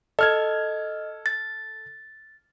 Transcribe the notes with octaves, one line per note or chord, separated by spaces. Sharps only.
A4 D#5 F6 G#6
A6